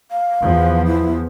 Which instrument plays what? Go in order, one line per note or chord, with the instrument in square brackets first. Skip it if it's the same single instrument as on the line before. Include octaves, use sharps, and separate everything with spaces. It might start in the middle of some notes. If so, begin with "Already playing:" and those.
[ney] F5
[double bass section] E2 F3 B3
[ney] E4